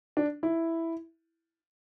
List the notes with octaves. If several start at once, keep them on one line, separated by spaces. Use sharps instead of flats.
D4
E4